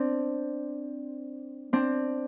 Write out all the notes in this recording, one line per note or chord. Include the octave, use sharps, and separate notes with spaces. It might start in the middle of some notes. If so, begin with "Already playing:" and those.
Already playing: C4 D4
C4 D4